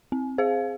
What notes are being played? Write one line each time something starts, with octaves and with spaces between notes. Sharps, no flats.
C4
G#4 C5 F5